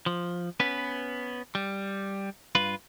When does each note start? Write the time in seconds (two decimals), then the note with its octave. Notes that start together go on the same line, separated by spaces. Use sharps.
0.06 F3
0.60 B3 C#4 B4
1.55 G3
2.55 G2 F4 B4